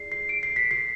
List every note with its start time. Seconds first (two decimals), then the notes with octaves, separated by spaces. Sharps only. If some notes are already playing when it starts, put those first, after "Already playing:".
Already playing: E4 G#4 D5 C7
0.12 C7
0.29 D7
0.43 C7
0.56 B6
0.71 C7